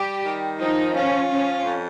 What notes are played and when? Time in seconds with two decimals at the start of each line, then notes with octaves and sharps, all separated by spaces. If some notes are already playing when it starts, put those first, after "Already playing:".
Already playing: G3 G4
0.26 D#3
0.59 F3 D#4
0.95 C#4 F4
1.29 F3 C#4
1.63 F2